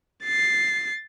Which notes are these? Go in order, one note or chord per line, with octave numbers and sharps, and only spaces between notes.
A6 C7